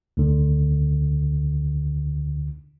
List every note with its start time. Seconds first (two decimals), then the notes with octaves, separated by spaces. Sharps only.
0.17 D2 D3